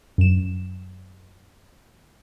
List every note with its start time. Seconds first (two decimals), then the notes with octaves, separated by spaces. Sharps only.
0.18 F#2 E7